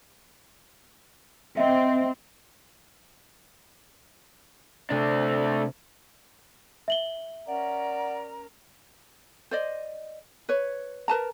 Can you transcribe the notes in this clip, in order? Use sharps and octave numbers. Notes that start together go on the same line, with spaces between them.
C4 D#5 E5
C3 A3 D4
E5 F#7 G7
C#4 A#4 D5 F#5 A#5
C5 D5 D#5
B4 C#5
A#4 B4 A5 A#5